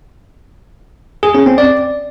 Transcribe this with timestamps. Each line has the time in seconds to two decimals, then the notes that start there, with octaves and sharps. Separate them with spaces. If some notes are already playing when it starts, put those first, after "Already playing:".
1.23 G#4
1.35 C#4
1.46 C4
1.58 D5